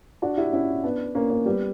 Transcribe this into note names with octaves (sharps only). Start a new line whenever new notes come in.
D4 F#4
E4 G4
C#4 E4
B3 D4
A#3 C#4
A#3 C#4
G3 B3